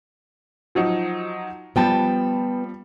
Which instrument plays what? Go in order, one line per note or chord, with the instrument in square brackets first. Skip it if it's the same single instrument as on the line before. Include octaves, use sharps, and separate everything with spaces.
[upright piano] F3 F#3 D#4
[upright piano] F3 G3 [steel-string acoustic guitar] B3 G5 A5